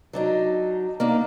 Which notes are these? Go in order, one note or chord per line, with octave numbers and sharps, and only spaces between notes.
F#3 D4 D#4
A#3 D4 D#4